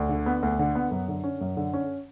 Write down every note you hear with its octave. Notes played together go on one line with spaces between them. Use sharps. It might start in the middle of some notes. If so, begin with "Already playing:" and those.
Already playing: D2
D3
B3
D2
D3
B3
F#2
D3
C#4
F#2
D3
C#4